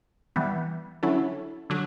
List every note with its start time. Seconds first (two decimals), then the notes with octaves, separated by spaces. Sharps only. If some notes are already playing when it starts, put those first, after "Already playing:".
0.36 E3 G3 B3
1.03 D3 F#3 C#4 E4 A4
1.70 D3 F#3